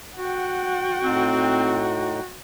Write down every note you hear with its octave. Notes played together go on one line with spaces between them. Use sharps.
F#4 F#5 G5
A2 C4 D#4